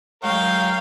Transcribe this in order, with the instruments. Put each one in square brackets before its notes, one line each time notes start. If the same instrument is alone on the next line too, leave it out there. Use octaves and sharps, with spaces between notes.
[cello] F#3 G#3 [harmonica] A#4 C#5 G5 [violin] F5